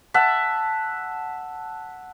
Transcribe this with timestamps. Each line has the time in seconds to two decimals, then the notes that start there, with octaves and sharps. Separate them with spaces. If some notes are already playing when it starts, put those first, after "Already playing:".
0.14 E5 F#5 A5